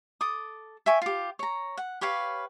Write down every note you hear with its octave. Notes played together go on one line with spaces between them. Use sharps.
A4 D6 D#6
E5 G5 G#5 C#6
F4 G4
C#5 A#5
F#5
G4 B4 C#5 F5